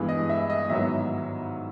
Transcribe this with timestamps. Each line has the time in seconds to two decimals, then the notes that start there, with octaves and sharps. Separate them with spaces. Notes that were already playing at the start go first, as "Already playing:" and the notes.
Already playing: G2 E3 G#3 B3
0.09 D#5
0.29 E5
0.50 D#5
0.70 G#2 D#3 F#3 B3 E5